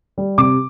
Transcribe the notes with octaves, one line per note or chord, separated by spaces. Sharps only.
G3
C3 D6